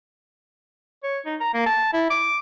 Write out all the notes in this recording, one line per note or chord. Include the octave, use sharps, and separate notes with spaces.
C#5
D#4
A#5
A#3
A5
E4
D6